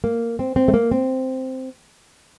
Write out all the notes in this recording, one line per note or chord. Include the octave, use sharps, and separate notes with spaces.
A#3
C4
C4
A3
A#3
C4